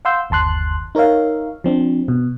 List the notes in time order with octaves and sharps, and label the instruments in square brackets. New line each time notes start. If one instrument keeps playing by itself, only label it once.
[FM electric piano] F5 F#5 C6 E6 G6
G1 D#2 A5 C6 F#6
D#4 A#4 C#5 E5 F5
F3 C4 D4
B2